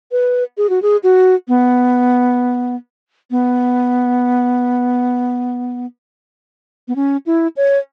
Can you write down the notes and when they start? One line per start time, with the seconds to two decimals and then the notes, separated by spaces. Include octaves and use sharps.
0.12 B4
0.57 G#4
0.69 F#4
0.82 G#4
1.03 F#4
1.48 B3
3.31 B3
6.88 B3
6.96 C#4
7.26 E4
7.57 C#5